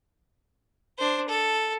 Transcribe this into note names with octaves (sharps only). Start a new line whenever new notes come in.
D4 C5
A4